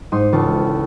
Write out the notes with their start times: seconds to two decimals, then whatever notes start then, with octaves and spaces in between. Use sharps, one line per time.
0.12 G#2 D#4 C6
0.32 E1 C#2 A4 A5 C#6 F6